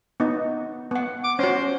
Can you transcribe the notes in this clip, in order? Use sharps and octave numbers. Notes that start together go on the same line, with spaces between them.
B3 D#4
B3 F#5
D6
C#4 F#4 C5